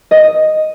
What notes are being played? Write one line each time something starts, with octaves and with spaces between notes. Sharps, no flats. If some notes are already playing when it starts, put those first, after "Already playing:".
D#5